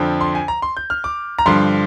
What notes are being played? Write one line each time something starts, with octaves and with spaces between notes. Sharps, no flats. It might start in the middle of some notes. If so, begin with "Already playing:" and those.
Already playing: F2 D3 F3
C6
G#5
A#5
C6
G6
F6
D6
A#5
G2 D3 F3 C6